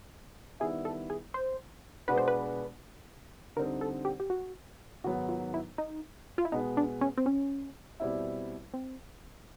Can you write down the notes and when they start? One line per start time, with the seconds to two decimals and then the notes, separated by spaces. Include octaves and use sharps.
0.60 D#3 G3 B3 E4 G#4
0.85 A4
1.10 G#4
1.34 C5
2.08 B2 G#3 B3 D4 F#4 B4
2.18 C5
2.28 B4
3.56 D3 G3 C4 D#4 A#4
3.81 A4
4.05 G4
4.20 G4
4.30 F#4
5.04 G#2 D#3 F#3 B3 F#4
5.29 F4
5.54 E4
5.78 D#4
6.38 F4
6.45 E4
6.52 B2 G#3 B3 D#4
6.77 D4
7.01 C#4
7.18 C4
7.26 C#4
8.00 B2 G3 C4 E4
8.74 C4